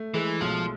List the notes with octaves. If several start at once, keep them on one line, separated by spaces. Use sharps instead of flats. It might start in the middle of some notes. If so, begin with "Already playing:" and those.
Already playing: A3
E3 G#3
B1 F3